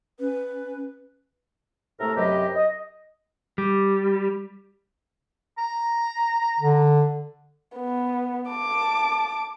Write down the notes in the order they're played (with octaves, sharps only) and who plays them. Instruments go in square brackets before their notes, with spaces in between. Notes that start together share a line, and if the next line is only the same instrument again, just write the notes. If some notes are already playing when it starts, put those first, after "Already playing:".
[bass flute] C#4 [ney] B4
[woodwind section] A2 C3 A3 A4 A#4 A#5
F#2 C3 F#3 G4 B4 D#5
D#5
[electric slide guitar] G3
[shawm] A#5
[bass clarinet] D3
[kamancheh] B3
A5 D6